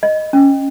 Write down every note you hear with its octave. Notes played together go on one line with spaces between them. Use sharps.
D#5
C#4